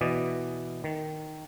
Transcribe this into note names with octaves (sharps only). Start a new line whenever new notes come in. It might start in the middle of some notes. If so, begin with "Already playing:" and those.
B2 E3 D5 D#5
D#3